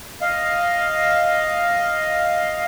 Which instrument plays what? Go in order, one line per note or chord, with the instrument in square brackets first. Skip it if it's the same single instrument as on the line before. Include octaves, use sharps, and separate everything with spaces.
[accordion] D#5 F5